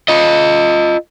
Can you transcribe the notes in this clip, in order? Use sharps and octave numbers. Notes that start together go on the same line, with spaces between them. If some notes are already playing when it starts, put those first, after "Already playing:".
F4 D#5